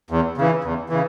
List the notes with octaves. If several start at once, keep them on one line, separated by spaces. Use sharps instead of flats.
E2
C#3 E3
E2
C#3 E3